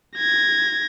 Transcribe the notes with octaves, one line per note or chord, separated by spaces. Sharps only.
G#6 A#6